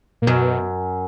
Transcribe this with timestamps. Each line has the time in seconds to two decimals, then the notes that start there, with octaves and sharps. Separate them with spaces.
0.22 A#2
0.27 F#2 B2